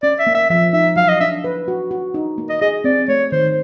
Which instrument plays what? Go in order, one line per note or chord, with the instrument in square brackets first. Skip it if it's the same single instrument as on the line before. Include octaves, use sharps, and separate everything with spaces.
[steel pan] C#4 [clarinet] D5
[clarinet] E5
[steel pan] A#3
[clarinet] E5
[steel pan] F3 [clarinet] E5
[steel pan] D#4 [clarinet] E5
[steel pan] F#3 [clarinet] F5
[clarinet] D#5
[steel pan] D4 [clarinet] E5
[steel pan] B4
F#4
F#4
D#4
A#3
[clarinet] D#5
[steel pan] G#4 [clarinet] D#5
[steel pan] C4 [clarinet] D5
[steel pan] A3 [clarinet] C#5
[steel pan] D#3 [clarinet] C5